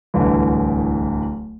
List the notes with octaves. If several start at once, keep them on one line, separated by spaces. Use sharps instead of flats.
D1 C2 D3 E3